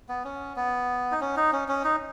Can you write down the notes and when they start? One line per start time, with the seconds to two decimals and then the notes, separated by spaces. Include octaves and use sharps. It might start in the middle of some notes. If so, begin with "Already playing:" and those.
0.09 B3
0.24 C#4
0.56 B3
1.12 D#4
1.21 C#4
1.37 D#4
1.53 C#4
1.68 C#4
1.84 D#4